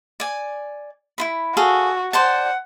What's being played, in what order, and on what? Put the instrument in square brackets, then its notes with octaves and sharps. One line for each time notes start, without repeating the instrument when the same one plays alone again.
[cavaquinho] D5 G#5
E4 F4 B5
[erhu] F#4 [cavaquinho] G#4 A4 F5
[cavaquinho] C5 D5 A5 [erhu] F#5